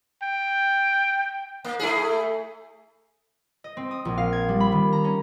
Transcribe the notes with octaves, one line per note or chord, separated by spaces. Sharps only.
G5
A#3
A3 E4 G#4
D#5
C4
D#6
A#1
F5
G#6
G3
B5
D#3
A#5
C#4